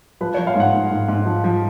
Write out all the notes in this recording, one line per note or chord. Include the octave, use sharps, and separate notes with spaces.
F3 B4
F3 C#5
F5
G#2 F#5
G#2
G#2
G#2
F3
F3